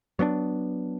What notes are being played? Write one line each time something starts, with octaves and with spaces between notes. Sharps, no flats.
F#3 B3 C#4 D4